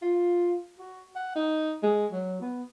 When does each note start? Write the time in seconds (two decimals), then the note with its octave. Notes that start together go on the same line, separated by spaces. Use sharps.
0.02 F4
0.79 F#4
1.16 F#5
1.36 D#4
1.83 G#3
2.12 F#3
2.41 B3